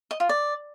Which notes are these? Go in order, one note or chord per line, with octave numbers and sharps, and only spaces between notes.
D#5
F4
D5